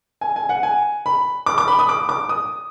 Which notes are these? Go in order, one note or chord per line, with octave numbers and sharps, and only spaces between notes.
G#5
G#5
F#5
G#5
B5
D6
D6
B5
D#6
D6
D6
D#6